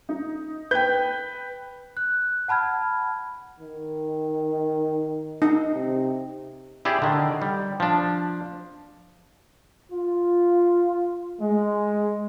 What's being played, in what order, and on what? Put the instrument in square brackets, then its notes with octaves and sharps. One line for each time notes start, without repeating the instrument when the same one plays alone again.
[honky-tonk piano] D#4
[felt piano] B4 G5 [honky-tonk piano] G6
[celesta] F#6
F#5 A5 B5 F6 G#6
[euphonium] D#3
[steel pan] D#4
[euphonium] C3
[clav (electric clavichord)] E4 G4 G#4 D5
D3 D#3
G3
F3 D4
[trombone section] F4
G#3